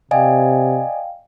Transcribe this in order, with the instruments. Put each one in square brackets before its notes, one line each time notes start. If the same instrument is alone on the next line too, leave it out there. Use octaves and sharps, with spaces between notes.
[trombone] C3 [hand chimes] D5 D#5 G#5 [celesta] F5 G5